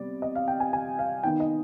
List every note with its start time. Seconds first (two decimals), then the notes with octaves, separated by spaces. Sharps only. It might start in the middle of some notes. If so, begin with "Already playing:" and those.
Already playing: C3 G3 B3 D5
0.22 D#5
0.35 F5
0.48 G5
0.60 G#5
0.73 G#5
0.99 F5
1.23 D#3 B3 D#4 G5
1.40 D#5